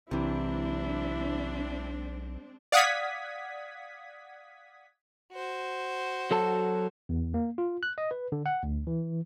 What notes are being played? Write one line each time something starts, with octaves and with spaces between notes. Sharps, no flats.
B1 C3 E3 G#3 C4 D4 E4
D5 F5 F#5 D#6 G#6 B6
F#4 C5
F#3 A4 A5
E2
A#3
F4
F#6
D#5
B4
D3
F#5
D2
E3